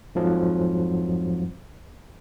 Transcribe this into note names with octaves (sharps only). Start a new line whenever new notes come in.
F2 G#2 F3 F#3